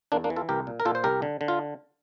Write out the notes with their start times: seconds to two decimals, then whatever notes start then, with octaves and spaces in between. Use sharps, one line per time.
0.12 E2 A#3 D4
0.24 A#3 D4
0.30 E3
0.36 F4 A4
0.49 C2 G4 A#4
0.67 A#2
0.80 A#4
0.85 A#2 F4 A4
0.95 C5
1.04 C2 G4 A#4
1.22 D3
1.41 D3
1.48 F4